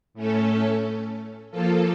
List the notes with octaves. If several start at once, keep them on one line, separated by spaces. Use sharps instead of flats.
A2 A3 C#4 A4
F3 A#3 F4 A4